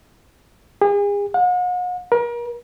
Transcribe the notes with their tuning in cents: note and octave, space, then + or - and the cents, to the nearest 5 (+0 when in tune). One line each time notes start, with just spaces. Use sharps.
G#4 -40
F#5 -40
A#4 +35